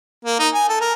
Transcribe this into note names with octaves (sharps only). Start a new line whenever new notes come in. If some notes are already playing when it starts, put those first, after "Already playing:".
A#3
D#4
G#5
A4
A#4